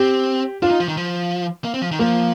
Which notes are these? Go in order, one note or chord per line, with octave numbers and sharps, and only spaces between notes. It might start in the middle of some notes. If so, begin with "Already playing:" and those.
Already playing: C4 G4
D4 F4
D#4
F3
D#3
F3
A#3
C4
F3
D#3
F3 A#3